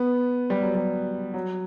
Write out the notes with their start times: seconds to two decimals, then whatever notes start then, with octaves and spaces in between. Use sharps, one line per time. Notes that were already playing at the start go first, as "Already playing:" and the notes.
Already playing: B3
0.50 G3
0.62 F#3
0.75 G3
1.34 F#3